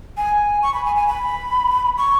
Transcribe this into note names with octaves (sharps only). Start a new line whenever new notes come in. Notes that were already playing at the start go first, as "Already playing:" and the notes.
G#5
C#6
B5
G#5
G#5
B5
C#6